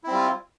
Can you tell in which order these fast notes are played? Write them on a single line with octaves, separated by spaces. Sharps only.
E4 C4 G3 F4